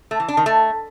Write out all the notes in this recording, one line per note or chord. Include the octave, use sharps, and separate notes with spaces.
A3
E3
D4
D#3
A3